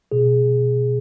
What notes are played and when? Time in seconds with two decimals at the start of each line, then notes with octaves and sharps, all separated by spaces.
0.11 B2 G#4